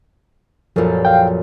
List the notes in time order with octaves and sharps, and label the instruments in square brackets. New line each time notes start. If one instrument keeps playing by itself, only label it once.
[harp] A#1 F#2 [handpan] F3 A4 A#4
[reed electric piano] F5 G5